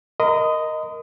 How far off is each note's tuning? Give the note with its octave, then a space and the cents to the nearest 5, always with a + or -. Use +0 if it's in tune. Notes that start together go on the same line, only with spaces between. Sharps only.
A#4 +0 D#5 +0 C6 -45